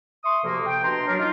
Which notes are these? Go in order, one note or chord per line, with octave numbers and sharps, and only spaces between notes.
E5 C6 C#6 D#6
D2 C3 F3 A#3
G5
B2 D4 A#5 C6
F#3 D4 A#4
D#4 F4